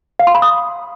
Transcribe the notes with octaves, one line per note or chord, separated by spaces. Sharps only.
F5
C6
B5
D#6